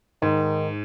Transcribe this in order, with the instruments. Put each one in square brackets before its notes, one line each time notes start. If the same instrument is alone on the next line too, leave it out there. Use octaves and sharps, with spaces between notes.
[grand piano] G#2 [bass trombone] D#3